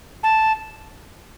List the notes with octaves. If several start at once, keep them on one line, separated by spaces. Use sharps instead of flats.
A5